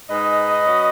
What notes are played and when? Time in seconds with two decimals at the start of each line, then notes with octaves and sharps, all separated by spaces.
0.09 G#2 G#3 D#4 B4 D#5
0.66 F#3 C#4